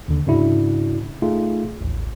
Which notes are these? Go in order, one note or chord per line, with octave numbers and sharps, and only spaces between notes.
D#2 D3
G#2 C#3 D4 E4 F#4
A3 D#4 F4 G#4
A1 D#2